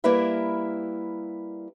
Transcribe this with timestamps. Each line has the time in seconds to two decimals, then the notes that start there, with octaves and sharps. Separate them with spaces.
0.04 G3 A#3 E4 A#4 B4 E5